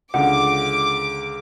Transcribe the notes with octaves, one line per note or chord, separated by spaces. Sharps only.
C#2 D3 G#3 F#5 D6